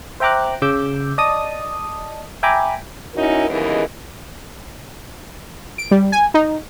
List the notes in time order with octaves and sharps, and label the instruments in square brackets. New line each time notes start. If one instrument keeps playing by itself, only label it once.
[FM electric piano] C5 E5 G5 A#5 D6 F#6
C#3 D6 E6 G6
D5 D#5 A5 D#6
E5 G5 G#5 A#5 B5 D6
[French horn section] C#4 D#4 E4 F#4 A#4
D#2 C#3 E3 G#3 B3 A#4
[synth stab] D7
G3
G#5
D#4